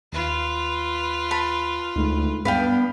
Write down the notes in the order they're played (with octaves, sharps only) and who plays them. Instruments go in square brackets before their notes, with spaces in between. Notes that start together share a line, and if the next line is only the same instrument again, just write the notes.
[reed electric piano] D#2 [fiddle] F4 B4
[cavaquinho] A5 B5
[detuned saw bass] D2 [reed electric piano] G#3 A3 D#4
[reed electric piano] G2 [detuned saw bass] B3 [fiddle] D4 [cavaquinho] B4 F5 G5